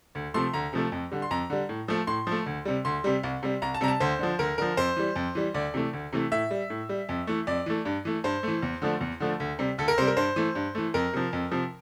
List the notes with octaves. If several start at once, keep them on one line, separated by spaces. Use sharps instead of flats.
D2
C3 F3 A3 C6
D2 A#5
C3 F3 A3
F2
D3 G3
C6
F2 A#5
D3 G3
A2
F3 A3
A2 C6
F3 A3
D2
C3 G3
D2 C6
C3 G3
C2
C3 G3
C2 A#5
A5
C3 G3 A#5
A5
D2 C5
D3 F3
D2 A#4
D3 F3 A#4
F2 C5
E3 G3
F2
E3 G3
D2 D5
C3 E3 A3
D2
C3 E3 A3
A2 E5
G3
A2
G3
F2
E3 A3
F2 D5
E3 A3
G2
E3 A3
G2 C5
E3 A3
E2
D3 F3 A3
E2
D3 F3 A3
D2
C3 G3
D2 A4
A#4
C3 G3 C5
A#4
G2 C5
E3 A3
G2
E3 A3
F2 A#4
C3 F3
F2
C3 F3